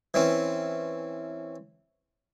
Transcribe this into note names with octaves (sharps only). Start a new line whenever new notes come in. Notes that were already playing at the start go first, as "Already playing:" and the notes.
E3 C4 C#4